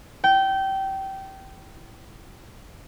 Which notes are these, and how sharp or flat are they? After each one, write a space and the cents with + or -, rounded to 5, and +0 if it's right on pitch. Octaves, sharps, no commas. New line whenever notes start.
E4 +20 G5 -20